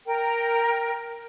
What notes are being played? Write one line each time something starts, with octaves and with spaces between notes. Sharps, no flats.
A#4 G5